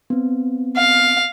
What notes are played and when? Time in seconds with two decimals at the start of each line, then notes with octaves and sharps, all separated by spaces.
0.10 B3 C4
0.76 F5